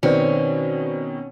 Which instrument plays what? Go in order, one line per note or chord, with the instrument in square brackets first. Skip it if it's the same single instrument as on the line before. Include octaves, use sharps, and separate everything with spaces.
[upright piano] B2 D#3 C4 [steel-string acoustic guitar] C#4 [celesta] B4 C5 D5